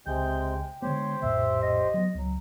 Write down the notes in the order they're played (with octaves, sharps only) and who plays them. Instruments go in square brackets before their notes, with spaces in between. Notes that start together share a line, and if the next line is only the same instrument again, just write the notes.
[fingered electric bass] C#2 [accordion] C3 G#3 G6 [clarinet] G5
[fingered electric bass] D3 G#3 B3 [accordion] G4 C5 [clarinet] C#5
[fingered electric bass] A#1 F2 A2 [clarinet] E5
[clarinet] D#5
[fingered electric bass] F#3 B3
[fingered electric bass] C#2 [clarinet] F#3